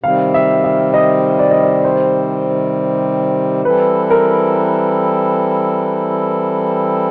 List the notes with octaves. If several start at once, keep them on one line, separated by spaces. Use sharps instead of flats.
C3 D#3 G3 C4 F5
E5
E5
D#5
D5
D#5
D5
C5
E3 G3 C4 E4 A4 B4
A#4